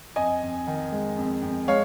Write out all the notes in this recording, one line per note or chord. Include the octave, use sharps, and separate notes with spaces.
F2 D#5 G#5
F2
D#3
G#3
F2
F2
G#3 C#5 F5